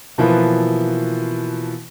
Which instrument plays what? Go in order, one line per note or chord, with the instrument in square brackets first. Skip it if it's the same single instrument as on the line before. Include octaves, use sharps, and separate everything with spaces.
[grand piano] B2 E3 F3 A#3 E4 B4